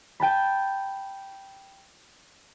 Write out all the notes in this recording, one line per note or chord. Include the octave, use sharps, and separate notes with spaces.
G5 A5 B5